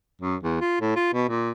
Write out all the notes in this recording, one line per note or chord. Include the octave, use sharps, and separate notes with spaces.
F#2
E2
F4
A2
F4
B2
A#2